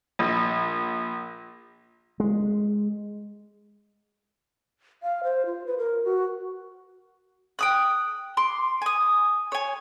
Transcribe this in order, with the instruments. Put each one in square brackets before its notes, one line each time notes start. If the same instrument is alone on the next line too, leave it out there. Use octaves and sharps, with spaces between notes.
[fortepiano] A#1
[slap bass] G#3
[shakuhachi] F5
C5
F4
B4
A#4
F#4
[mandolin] G5 D#6 F#6
C6 D6
G#5 D#6
C#5 G#5